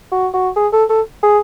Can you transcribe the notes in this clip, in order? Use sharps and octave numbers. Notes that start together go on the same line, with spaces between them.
F#4
F#4
G#4
A4
A4
G#4